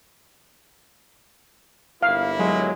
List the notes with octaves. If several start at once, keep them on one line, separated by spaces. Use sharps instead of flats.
G1 A#3 E4 F5
F#3 G#3